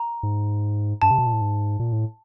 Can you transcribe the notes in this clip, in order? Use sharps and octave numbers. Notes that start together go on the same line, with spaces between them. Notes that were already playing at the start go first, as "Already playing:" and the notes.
Already playing: A#5
G#2
G2 A5
C3
B2
A#2
A2
G#2
A#2
A2